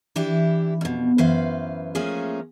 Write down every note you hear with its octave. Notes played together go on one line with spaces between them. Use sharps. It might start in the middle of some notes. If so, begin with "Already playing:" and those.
E3 D4 E4 G4
F2 B2
F#2 E3 B4 C5 F5
F3 A3 A#3 C#4 G#4